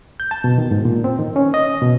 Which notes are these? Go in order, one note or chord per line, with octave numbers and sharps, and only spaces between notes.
G6
A5
B2
D#3
G#2
A#2
C4
D#3
C#4
D#5
B2